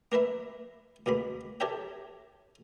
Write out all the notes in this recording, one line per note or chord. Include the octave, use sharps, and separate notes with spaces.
A#3 A#4 B4 E5
C#2 B2 A#3 B5
G4 A4 A#4 C#5 E5 G5